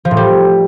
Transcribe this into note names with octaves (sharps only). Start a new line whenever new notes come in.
F3
A2
G3